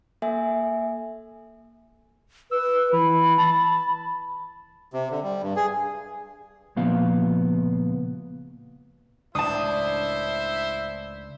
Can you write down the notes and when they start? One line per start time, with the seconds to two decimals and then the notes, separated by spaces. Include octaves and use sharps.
0.22 A#3 A4 E5 G#5
2.51 B4 E6
2.93 E3 B5
3.38 A5
4.93 C3
5.11 D3
5.23 G3
5.42 G2
5.56 G#4
6.76 C#2 A#2 F3 B3 F5
9.35 C#2 A2 D4 E4 C5 E5 A5 D#6